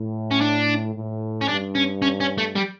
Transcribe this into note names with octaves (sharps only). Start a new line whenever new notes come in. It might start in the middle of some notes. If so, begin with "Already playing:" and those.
Already playing: A2
C#4
D4
A2
C#4
G2 D4
C#4
C#4
C#4
A3
G3